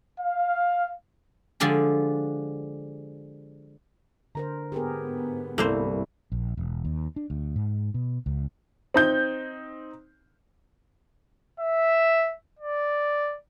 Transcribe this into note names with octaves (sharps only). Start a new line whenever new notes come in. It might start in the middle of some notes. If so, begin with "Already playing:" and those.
F5
D3 F3 G#3 D4 G4
D3 A#4 C5 A#5
G#2 B3 G4 G#4 A#4
C2 G2 A3 A#3 E4 C5
A#1
E1
D#2
D4
D2
G#2
B2
C#2
C4 D#4 G6
E5
D5